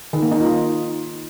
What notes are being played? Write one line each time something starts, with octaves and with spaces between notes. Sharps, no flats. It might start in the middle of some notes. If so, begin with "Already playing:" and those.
D#3
A#3
D#4
F4